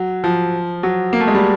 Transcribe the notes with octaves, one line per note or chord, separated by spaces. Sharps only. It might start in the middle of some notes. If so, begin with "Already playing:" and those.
Already playing: F#3
F3
F#3
A#3
A3
G#3
G3